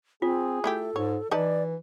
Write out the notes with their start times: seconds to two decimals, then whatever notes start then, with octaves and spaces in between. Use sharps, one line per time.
0.22 C4 F4 G#4
0.64 A3 E4 G4 A4
0.96 G#2 C#5
1.31 E3 D#4 B4 D5 A5